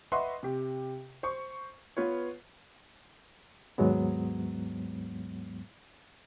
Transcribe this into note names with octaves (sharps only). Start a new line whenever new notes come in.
B4 D#5 E5 F#5 C6 C#6
C3 G4
C5 C#6
B3 F4 B4 C#5
D#2 G#2 F#3 G#3 B3